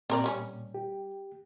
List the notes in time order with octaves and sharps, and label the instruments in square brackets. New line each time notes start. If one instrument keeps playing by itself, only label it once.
[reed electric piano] A#2 [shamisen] C4 A#4 D5
[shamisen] G3 C#4
[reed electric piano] G4